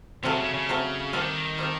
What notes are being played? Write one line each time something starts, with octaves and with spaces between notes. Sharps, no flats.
C3 F#3 A3 C4 F4 A4
C#3
C#3
F#3 A3 C4 F4 A4
D#3 G3 C4 F4 A4
G3 C4 F4 A4